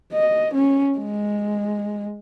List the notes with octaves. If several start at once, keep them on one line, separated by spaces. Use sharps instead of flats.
D#5
C#4
G#3